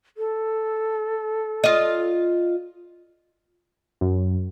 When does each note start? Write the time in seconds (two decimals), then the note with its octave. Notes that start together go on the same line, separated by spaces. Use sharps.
0.17 A4
1.64 F4 D#5
4.01 F#2